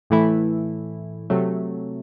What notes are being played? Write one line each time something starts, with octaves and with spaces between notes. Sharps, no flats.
A2 E3 A3 E4
C3 F#3 A3